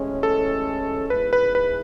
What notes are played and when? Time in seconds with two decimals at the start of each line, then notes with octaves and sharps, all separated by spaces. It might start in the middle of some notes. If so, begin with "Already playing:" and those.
Already playing: A1 A2 G#3 C#4
0.23 A4
1.10 G#2 E3 B3 E4 G#4 B4
1.33 B4
1.55 B4